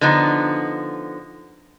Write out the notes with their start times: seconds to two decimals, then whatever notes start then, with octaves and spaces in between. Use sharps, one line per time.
0.01 D3 F3 B3 D#4